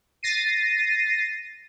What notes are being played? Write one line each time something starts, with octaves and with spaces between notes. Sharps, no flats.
A6 A#6 C7 D#7